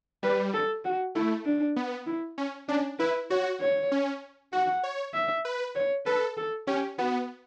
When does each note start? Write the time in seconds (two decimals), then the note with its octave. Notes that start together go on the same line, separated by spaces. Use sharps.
0.23 G3 B4
0.54 A4
0.85 F#4
1.15 A3 E4
1.45 D4
1.76 B3
2.06 E4
2.38 C#4
2.68 C#4 D4
2.99 E4 B4
3.30 F#4 C#5
3.61 C#5
3.92 C#4
4.53 F#4 F#5
4.83 C#5
5.14 E5
5.45 B4
5.75 C#5
6.06 A4 B4
6.37 A4
6.67 C#4 G4
6.98 B3 F#4